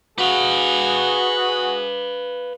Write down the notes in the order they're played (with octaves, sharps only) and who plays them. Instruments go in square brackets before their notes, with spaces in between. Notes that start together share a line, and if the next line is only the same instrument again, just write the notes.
[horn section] F#4 G#4 [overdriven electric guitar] B4 F5